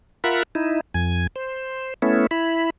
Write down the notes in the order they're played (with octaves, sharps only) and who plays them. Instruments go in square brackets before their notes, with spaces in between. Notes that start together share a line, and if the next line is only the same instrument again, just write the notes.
[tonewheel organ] F4 A#4 E5 F#5 B5
D#4 E4
F2 G#5
C5
A3 B3 C#4 E4
E4 B5